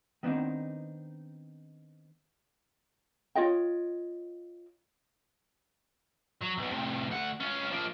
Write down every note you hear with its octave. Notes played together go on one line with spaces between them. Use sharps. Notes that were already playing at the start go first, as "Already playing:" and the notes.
D#3 B3 C4 D4 D#4
F4 C#5 D#5 G5
F#3
B1 B2
A2 C3
D2 F#5
C#4 F4
F3 A#3